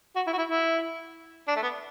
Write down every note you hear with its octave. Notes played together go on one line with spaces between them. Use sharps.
F#4
E4
F#4
E4
E4
D4
A3
B3